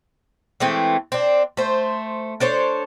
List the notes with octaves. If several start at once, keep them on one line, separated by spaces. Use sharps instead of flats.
E3 G#3 A3 C4
C4 D4
A3 C5
D4 A4 C5 C#5